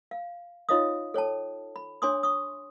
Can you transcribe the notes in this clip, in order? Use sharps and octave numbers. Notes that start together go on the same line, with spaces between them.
F5
D#4 F4 C#5 D#5 F5 D#6
A4 C#5 G5 A5
B5
D4 C#5 G#5 C6 D6 D#6
C#6 D#6